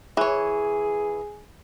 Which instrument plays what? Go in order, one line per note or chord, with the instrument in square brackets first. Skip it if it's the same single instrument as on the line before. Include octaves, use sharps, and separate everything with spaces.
[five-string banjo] E3 C#5 [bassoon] G#4